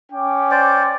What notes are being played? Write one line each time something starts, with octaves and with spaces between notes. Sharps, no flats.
C#4 G5 D6
C5 D5